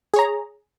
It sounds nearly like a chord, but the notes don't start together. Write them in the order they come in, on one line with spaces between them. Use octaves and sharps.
G#4 C#5 A#5